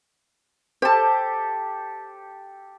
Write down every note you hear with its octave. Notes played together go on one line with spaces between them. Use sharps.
G4 A4 C5 A5